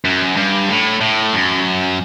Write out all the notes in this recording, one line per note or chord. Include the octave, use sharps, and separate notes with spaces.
F#2
G2
A2
A2
F#2